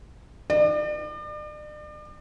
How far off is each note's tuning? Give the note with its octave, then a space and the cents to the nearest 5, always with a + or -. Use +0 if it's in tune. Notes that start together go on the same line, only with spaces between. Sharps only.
D5 +40